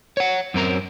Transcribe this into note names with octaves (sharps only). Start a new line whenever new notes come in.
C#5 F#5
F#2 C4 A#4 A#5